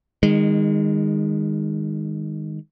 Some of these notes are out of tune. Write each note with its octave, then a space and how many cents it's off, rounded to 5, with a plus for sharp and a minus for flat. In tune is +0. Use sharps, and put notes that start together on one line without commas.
D#3 +0 G#3 -30